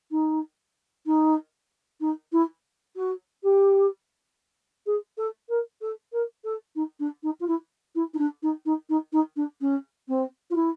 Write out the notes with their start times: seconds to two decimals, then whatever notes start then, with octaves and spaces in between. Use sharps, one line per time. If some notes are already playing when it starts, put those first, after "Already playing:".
0.11 D#4
1.06 D#4
2.00 D#4
2.32 E4
2.96 F#4
3.43 G4
4.86 G#4
5.17 A4
5.49 A#4
5.81 A4
6.12 A#4
6.44 A4
6.75 D#4
6.99 D4
7.23 D#4
7.40 F4
7.47 E4
7.95 E4
8.14 D#4
8.18 D4
8.42 D#4
8.65 D#4
8.89 D#4
9.12 D#4
9.36 D4
9.61 C#4
10.08 C4
10.50 F4
10.55 E4